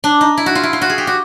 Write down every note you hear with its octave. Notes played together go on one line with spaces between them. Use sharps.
D4
D#4
E4
F#4
F4
E4
F4
F#4
G#4
G4
F#4